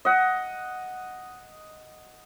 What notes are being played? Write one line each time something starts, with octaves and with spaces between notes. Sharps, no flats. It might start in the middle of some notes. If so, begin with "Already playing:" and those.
D#5 F#5